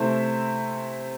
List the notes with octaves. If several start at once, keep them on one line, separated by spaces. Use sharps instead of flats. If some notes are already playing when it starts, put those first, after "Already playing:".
Already playing: C3 A3 E4 C5 E5